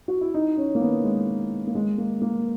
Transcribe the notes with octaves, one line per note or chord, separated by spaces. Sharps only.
F#4
E4
D#4
C#4
A#3
B3
G#3
A#3
G#3
A#3
A#3